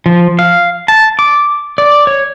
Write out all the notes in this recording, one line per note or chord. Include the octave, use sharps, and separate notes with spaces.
F3
F5
A5
D6
D5
C#5